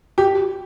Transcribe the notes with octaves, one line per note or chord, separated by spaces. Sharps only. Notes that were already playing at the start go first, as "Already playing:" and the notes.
G4